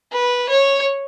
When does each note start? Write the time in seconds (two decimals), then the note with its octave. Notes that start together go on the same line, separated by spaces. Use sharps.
0.13 B4
0.49 C#5